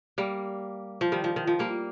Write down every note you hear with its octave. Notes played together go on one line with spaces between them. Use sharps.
G3 A#3
F3
D#3 G3
F3
D#3
F3
G3 A#3